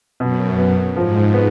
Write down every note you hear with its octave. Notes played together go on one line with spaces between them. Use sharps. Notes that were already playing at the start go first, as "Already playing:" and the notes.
F#2 B2
B3
G#2 F3
B3